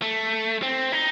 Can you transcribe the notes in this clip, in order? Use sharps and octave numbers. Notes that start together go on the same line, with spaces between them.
A3
C4
D#4